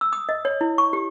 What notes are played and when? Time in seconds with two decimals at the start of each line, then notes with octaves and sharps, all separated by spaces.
0.01 E6
0.13 D#6
0.29 D#5
0.45 C#5
0.61 E4
0.78 C#6
0.93 G4